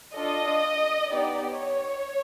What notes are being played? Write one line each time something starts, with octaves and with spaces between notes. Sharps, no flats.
D4 F4 A4 D#5
B3 D#4 G4 D5
C#5